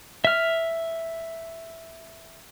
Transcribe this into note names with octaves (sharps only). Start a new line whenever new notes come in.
E5 F6